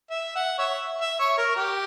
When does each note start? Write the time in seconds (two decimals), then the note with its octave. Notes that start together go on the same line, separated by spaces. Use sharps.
0.10 E5
0.35 F#5
0.58 C#5 E5
1.01 E5
1.20 C#5
1.37 A#4
1.56 G4